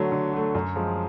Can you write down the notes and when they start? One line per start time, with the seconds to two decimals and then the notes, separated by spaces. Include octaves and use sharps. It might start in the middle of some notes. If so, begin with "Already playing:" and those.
Already playing: D3 F#3 A3
0.12 D3
0.33 F#3 A3
0.55 F#2
0.76 F3 G#3